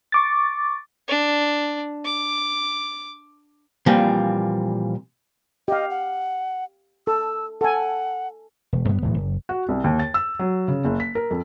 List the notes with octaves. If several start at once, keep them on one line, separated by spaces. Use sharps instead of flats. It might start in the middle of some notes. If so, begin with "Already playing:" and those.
C#6 D6 A6
D4
D6
A#2 E3 F3 G3 C4
G4 D#5 F5
F#5
A4 E6
A4 F#5 G#5
E1
F#2 B3
D1 A2 E3
F#1
F#4
C2
D#2
A6
E6
F#3
C#3
F#1
B6
A#4
F2